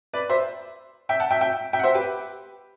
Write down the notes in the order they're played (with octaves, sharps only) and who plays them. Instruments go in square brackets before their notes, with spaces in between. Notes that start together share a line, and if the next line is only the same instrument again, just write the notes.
[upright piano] B4 D5
C5 E5
E5 G5
F#5 A5
E5 G5
E5 G5
E5 G5
F#5
C5 E5
G4 B4